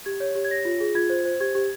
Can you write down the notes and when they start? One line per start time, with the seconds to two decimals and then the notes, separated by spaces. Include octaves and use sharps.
0.06 G4 G#6
0.20 C#5
0.35 G4
0.45 G#6
0.50 C#5 A#6
0.65 F4
0.80 G#4
0.95 F4 G#6
1.10 C5
1.25 C5
1.40 G4 G#6
1.55 G4